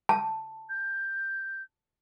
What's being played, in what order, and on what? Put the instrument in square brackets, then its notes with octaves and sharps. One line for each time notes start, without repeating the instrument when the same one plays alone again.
[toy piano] A5
[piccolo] G6